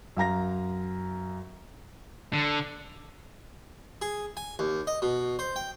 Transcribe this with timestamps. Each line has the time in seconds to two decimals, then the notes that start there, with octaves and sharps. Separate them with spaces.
0.17 F#2 F5 A#5 A#6
2.33 D3
4.02 G#4
4.37 G#5
4.59 D#2
4.87 D#5
5.02 B2
5.39 C5
5.56 G5